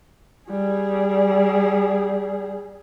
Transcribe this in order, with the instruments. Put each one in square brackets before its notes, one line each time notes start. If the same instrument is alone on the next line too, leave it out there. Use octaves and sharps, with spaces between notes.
[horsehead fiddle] G3 G#4